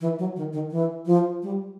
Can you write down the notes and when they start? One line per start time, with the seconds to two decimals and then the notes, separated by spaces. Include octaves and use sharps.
0.01 E3
0.19 F#3
0.36 D#3
0.53 D#3
0.71 E3
1.06 F3
1.43 G3